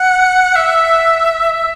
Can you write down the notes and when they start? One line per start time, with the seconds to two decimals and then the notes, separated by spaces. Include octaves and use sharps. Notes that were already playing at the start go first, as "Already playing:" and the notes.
Already playing: F#5
0.56 E5
1.52 E5